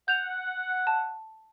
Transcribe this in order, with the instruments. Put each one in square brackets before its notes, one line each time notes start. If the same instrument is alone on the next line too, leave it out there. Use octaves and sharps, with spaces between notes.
[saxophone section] F#5 [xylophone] G6 F7
[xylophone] A5